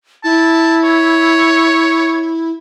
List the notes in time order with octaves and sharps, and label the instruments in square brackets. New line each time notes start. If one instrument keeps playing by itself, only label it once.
[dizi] E4 [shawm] A5
[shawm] C#5